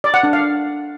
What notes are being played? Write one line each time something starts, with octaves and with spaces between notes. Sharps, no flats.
D5
F#5
D4
F5